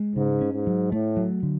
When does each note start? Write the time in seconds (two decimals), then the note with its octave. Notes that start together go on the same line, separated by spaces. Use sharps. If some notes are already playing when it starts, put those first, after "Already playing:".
Already playing: G#3
0.16 G#2 C#3
0.41 C#4
0.53 G#2
0.67 F#3
0.92 A2 A3
1.17 F#3
1.43 D3